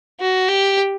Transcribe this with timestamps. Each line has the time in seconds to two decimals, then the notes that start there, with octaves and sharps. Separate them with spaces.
0.20 F#4
0.48 G4